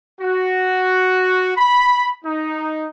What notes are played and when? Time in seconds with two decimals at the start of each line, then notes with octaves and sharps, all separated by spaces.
0.21 F#4
1.58 B5
2.25 D#4